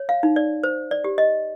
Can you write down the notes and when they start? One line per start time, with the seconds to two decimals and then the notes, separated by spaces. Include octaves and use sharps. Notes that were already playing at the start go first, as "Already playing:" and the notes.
Already playing: C#5
0.09 F5
0.23 D#4
0.36 D5
0.64 C5
0.91 D5
1.04 G4
1.18 D#5